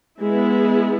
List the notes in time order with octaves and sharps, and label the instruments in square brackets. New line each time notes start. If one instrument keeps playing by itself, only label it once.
[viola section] G#3 B3 E4